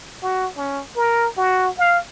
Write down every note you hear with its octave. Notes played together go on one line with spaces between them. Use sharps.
F#4
C#4
A#4
F#4
F5